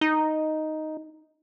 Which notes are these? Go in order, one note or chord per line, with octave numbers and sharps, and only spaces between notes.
D#4